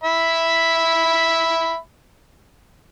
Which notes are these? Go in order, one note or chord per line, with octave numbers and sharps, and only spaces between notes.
E5 B5